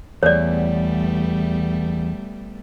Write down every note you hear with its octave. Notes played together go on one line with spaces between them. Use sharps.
E2 G3 A3 B3 C#5 D5